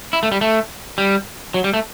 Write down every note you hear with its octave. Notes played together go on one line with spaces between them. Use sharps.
E4
A3
G3
A3
G3
F#3
G3
A3